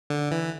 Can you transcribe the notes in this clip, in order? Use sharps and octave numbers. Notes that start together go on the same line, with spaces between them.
D3
E3